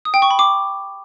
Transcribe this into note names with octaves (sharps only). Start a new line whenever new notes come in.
D#6
G5
C#6
B5
D6